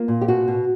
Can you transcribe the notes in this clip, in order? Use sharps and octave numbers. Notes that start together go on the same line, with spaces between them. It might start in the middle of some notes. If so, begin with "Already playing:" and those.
Already playing: A#3 F4
A#2
G4
B2 F#4
B2